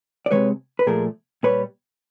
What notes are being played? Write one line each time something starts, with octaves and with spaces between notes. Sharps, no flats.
D5
C3 D#3 G#3 B4 C#5
B4
A#2 F3 A3 G#4 A#4
A#2 G3 B4 C#5